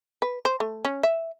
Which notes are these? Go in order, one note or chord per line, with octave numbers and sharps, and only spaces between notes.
B4
C5
A3
C#4
E5